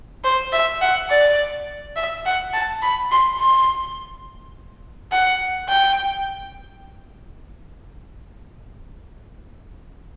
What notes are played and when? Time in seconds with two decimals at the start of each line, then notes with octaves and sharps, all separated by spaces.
0.24 C5
0.53 E5
0.81 F#5
1.10 D5
1.96 E5
2.25 F#5
2.53 A5
2.82 B5
3.11 C6
3.40 C6
5.12 F#5
5.68 G5